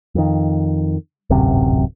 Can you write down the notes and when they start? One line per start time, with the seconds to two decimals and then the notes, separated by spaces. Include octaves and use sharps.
0.15 F2 D#3
1.30 D1 G#1 F#2 C3